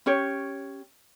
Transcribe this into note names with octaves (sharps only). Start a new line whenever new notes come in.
C#4 G4 C#5